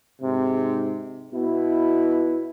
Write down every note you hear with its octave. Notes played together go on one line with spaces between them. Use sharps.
G#2 C3
B2 B3 E4